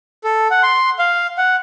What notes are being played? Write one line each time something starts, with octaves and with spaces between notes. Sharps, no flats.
A4
F#5
C6
F5
F#5